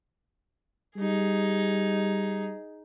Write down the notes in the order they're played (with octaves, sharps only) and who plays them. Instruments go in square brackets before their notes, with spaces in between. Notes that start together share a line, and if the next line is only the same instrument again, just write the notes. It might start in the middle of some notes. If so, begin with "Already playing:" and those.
[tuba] G3 [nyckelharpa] D#4 G#4